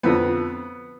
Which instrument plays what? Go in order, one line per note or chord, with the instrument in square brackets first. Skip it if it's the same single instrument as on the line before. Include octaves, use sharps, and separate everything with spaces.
[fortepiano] F2 D3 F3 B3